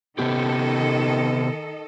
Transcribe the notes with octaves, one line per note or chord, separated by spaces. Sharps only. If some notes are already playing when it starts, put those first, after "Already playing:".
C3 D#3 B3 G4 A4 D#5